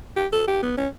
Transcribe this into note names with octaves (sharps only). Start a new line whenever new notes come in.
G4
A4
G4
B3
C#4